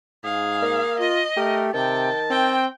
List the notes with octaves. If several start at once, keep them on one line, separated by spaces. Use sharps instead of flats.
G#2 G#4 F5
A#3
F4 D#5
A3 G4 A#4
C3 D#3 G5 A5
C4 G5